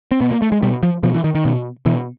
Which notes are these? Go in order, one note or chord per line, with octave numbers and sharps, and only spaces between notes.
C4
B2 B3
A#3
A3
G#3
B2 G3
F3
B2 F3
E3
D#3
D#3
B2
B2 E3